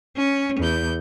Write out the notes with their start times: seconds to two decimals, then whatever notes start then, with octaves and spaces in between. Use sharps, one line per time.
0.16 C#4
0.60 E2 G6